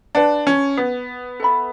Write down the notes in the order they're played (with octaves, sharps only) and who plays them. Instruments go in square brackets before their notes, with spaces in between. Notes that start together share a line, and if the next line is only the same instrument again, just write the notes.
[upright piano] D4 [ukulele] B4 F#5 A5
[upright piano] C#4
B3
[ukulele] A4 E5 B5